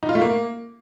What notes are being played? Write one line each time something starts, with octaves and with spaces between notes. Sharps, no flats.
D#4
F4
A3
A#3